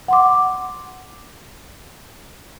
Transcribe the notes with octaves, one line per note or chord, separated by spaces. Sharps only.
F#5 C6 D6